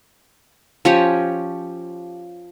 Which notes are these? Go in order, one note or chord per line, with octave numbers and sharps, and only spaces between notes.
F3 C#4 G4 C#5